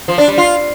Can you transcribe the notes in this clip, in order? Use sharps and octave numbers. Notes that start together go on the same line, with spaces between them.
F3
D4
G3
F4